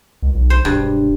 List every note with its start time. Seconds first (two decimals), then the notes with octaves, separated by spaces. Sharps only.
0.22 C#2
0.35 B1
0.50 C5
0.65 E1 G2